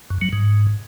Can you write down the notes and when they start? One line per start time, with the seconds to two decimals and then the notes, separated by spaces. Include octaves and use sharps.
0.10 F#2
0.21 F#3
0.33 G#2